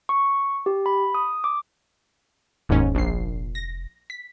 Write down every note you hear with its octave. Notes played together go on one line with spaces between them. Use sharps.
C#6
G4
B5
D#6
D6
F1 D#2 G#2 C#4
A#1 C7
A#6
B6